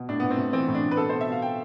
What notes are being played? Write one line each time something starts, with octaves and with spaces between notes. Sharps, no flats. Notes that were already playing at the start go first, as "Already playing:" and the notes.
Already playing: B2
A2 D4
A2 B3
C4
A2
E3 C4
A2
D4
A2
B4
B2 A4
B2 C5
E5
B2 F5
B2 G5